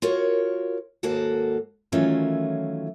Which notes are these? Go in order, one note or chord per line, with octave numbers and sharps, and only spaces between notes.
F4 F#4 A#4 C#5
D#2 G#2 A#3 F#4 A4 F#5
D#3 E3 F#3 A3 C#4 F4